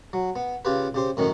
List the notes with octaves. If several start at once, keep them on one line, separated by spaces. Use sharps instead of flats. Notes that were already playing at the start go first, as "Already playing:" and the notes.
F#3
B3
C#3 F4 G4 B4
C#3 G4 C5
F#2 A2 D#3 C#4